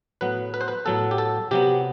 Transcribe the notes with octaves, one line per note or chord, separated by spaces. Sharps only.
A2 F#3 B3 B4
B4
C5
B4
A2 F#3 B3 A4
G4
A4
C3 F#3 B3 G4